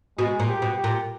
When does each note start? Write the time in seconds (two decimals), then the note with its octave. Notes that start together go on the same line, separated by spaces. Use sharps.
0.18 B2 G#3
0.40 A#2
0.48 G4
0.62 B2
0.77 G4
0.84 A#2